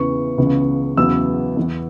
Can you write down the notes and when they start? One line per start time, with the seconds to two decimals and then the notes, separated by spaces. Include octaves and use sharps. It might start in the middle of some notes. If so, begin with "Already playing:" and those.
Already playing: E2 C#3 E3 C#6
0.38 C#2 C#3 E3 B3
0.97 E2 C#3 F#3 B3 E6
1.57 E2 E3 B3